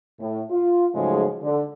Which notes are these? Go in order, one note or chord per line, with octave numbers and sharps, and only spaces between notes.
A2
F4
G#2 C#3 F3 F#3 G#3 A3
D3